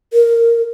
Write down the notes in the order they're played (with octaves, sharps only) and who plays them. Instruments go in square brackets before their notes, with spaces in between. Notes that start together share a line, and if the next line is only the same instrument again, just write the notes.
[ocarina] A#4